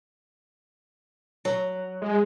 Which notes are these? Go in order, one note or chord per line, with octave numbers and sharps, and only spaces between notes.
F#3
G#3